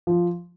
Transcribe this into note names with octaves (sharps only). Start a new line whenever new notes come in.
F3